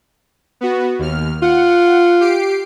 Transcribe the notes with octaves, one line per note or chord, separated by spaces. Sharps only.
B3 F#4
D#2 F6
F4 F#5
G4 C7 D7